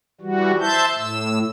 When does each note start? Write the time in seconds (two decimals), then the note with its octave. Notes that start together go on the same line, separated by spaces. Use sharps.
0.21 E3 G3 F#4
0.60 C5 E5 A5 G6
0.95 A2 E6